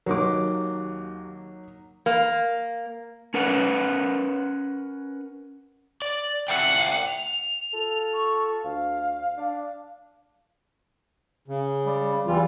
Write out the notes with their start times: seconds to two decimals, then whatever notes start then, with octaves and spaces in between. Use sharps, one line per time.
0.06 D#2 F#3 A#3 D#4 D6
2.06 A#3
3.34 C#4 A#4 B4 F#5
6.02 D5
6.48 D5 E5 F#5 G5
7.07 F7
7.73 F4 A4
8.13 C#6
8.63 D2 F5
9.38 D4
11.48 C#3
11.86 G3
12.26 E2 E3 G3 F4